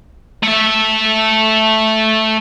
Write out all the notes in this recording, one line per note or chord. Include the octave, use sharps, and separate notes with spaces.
A3 E5